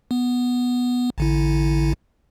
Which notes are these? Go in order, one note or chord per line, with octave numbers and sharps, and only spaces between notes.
B3
A1 D3 E4